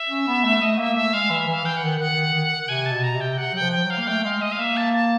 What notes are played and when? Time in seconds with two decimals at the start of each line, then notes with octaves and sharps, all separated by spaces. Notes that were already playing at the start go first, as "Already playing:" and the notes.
Already playing: E5
0.09 C#4
0.27 B3
0.44 A3
0.61 A3 D#5
0.78 A#3 E5
0.96 A3 E5
1.13 G#3 F5
1.30 E3 E5
1.47 E3
1.53 F5
1.65 E3 G5
1.77 F#5
1.83 D#3
1.99 D#3 F#5
2.16 D#3
2.34 D#3
2.68 C3 G#5
2.86 A5
2.92 B2
3.04 A#5
3.16 C3 G5
3.38 C3 F#5
3.53 F#3 G5
3.62 F3
3.73 F3 G5
3.84 F#3
3.90 F5
3.98 A#3
4.08 A3 G5
4.24 G#3 F5
4.41 G#3 D#5
4.52 F5
4.59 A#3 E5
4.77 A5
4.94 A5